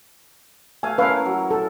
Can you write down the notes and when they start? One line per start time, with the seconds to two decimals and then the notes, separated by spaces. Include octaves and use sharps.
0.83 A3 F5 G#5
0.98 C#4 E4 A#4 B4 F5 G#5
1.26 F#3
1.51 A4